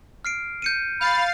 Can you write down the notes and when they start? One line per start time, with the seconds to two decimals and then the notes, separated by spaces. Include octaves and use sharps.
0.25 F6 C7 D7
0.62 G6 C#7 D#7
1.01 F5 B5 G6 A6 C7